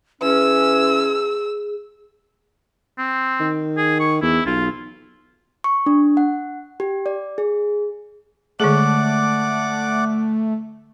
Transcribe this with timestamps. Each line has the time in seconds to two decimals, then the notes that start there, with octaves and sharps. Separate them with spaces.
0.22 E3 C#4 G#4 E6
2.99 C4
3.40 D#3
3.77 G#4
4.00 C#6
4.22 E2 E4
4.46 B1 F4
5.64 C#6
5.86 D4
6.17 F#5
6.80 G4
7.06 D5
7.38 G#4
8.60 D3 G#3 A3 G#4 D5 F#5 D6